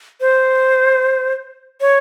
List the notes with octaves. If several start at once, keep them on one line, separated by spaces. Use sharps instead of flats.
C5
C#5